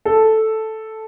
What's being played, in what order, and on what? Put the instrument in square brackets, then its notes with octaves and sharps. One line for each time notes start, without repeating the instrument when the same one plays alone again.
[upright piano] A4